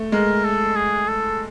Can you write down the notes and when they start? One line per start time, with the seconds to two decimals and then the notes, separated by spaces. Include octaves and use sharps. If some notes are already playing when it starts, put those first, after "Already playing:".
Already playing: A3
0.12 G#3 A#4
0.45 A4
0.76 G#4
1.09 A4